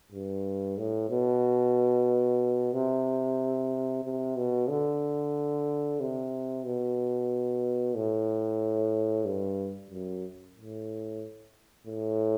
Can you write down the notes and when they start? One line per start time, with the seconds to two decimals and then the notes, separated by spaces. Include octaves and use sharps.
0.12 G2
0.78 A2
1.10 B2
2.73 C3
4.04 C3
4.36 B2
4.69 D3
6.00 C3
6.65 B2
7.96 A2
9.25 G2
9.91 F#2
10.56 A2
11.87 A2